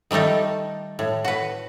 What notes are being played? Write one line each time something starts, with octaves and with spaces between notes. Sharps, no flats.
D#3 G3 A3 D#4 A4
A2
F#4 B4